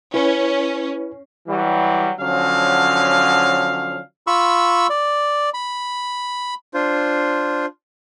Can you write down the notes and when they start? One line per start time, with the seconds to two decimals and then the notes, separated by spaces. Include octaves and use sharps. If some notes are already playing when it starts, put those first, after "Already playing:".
0.14 C#4 E4 B4
1.48 E3 F#3 G3
2.20 D3 F3 F#3 C#4 F5
4.27 F4 B5 C#6 E6
4.90 D5
5.54 B5
6.74 D4 F4 C5